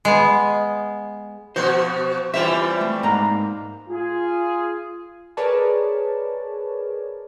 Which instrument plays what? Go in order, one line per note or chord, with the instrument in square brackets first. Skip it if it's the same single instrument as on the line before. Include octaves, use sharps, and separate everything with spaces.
[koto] G#3 B3
[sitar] B2 F3 F#4 [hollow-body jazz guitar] C5
[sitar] E3 G3 C4 [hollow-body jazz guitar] F4 C#5 E5
[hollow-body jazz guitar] A3
G#2 A#3 A#5
[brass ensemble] F4 G#4
[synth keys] G#4 A#4 B4 C#5 D5 A5